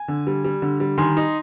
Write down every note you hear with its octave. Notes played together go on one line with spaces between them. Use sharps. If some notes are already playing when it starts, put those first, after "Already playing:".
Already playing: G#5
D3
G3
G3
D3
G3
D#3 G#5 C6
D#4